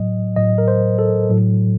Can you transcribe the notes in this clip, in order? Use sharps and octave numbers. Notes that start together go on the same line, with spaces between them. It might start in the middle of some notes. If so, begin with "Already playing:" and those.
Already playing: A2 F#3 D#5
A2 F#3 D#5
A#4
C5
A4
A2 F#3